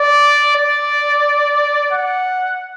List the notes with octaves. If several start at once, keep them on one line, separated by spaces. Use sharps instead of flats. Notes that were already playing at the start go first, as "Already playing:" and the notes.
Already playing: D5
D5
F#5